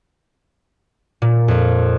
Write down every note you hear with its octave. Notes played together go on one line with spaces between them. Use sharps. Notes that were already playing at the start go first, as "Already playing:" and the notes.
A#2
F2